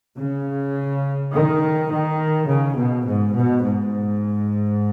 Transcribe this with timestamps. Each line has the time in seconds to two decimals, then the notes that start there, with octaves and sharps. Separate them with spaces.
0.16 C#3
1.32 D#3
1.89 D#3
2.46 C#3
2.76 B2
3.04 G#2
3.33 B2
3.62 G#2